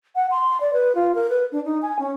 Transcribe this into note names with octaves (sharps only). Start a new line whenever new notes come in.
F#5
C6
D5
B4
F4
A#4
B4
D4
D#4
G#5
C#4